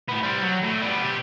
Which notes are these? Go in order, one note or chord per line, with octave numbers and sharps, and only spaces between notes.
A2 B3
G3 C4
F#3
A2
G3 B3
C3 G4